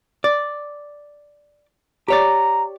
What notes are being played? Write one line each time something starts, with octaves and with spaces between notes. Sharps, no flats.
D5
G4 C#5 D5 A#5